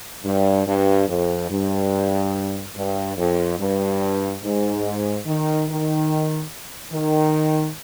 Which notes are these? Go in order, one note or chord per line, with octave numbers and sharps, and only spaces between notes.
G2
G2
F2
G2
G2
F2
G2
G#2
D#3
D#3
D#3